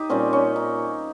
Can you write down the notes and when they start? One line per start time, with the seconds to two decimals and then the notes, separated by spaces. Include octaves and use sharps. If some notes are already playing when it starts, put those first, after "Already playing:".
Already playing: D#4 G4
0.10 A#2 G3 C4 C#4
0.33 C#4
0.56 D#4